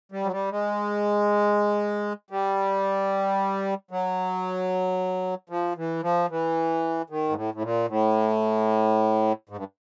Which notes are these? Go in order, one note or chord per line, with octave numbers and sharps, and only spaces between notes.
G3
F#3
G3
G#3
G3
F#3
F3
E3
F3
E3
D#3
G#2
A2
A2
A#2
A2
G#2
G2